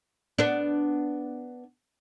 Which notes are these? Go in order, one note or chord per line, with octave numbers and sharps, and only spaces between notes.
B3 D4